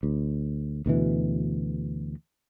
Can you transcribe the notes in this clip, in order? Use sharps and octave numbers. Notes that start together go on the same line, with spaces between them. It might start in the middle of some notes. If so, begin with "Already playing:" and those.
D2
D2 B2 E3